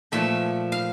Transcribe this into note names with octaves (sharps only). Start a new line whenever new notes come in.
A#2 F3 A3 E5
F5